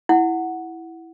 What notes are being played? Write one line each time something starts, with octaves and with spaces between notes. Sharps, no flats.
E4 F#5